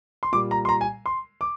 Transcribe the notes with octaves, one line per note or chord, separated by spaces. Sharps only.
C6
A#2 G3 D6
A#5
C6
A#5
G#5
C6
D6